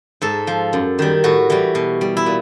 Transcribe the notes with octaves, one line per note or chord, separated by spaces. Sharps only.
G#2 A4
F3
F#2
D#3 G3
A2 F#4
E3 G3
B2
G3
E4
A#2